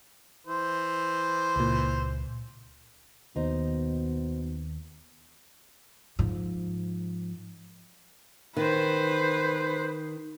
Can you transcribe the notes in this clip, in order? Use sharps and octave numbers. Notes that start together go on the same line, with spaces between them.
E3 C5
C#2 A#2
D#2 B2 D#4 C5
G#2 F3
D#3 B4 C5